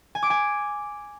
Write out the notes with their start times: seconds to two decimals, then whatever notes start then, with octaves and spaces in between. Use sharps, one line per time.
0.15 G#5
0.23 D6
0.30 G#5